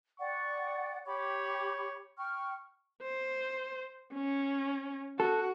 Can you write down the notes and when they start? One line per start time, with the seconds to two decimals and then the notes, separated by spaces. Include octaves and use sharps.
0.20 D5 F#5 G5 C#6
1.06 G4 C#5 B5 D6
2.17 G5 C#6 F6
3.02 C5
4.14 C#4
5.20 F#4 A4